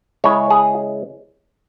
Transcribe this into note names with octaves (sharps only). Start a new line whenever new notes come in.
C#3 G#3 C#4 E4 C#5
G#4